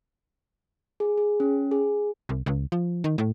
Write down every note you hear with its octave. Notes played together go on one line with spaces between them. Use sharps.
G#4
G#4
C#4
G#4
C2
C#2
F3
D#3
A2